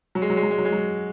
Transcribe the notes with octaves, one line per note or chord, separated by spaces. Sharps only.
F#3
G#3
F#3
G#3
F#3
G#3
F#3
G#3
F#3